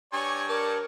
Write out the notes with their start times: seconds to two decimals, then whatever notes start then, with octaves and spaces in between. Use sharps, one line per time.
0.13 G2 C#5 D5 G#5 C#6
0.48 A#4 D5 A5